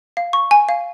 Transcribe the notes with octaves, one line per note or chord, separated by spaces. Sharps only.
F5
C#6
G#5
F5